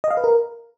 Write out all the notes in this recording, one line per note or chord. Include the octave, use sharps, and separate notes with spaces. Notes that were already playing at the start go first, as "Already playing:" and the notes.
D#5
F5
B4
A#4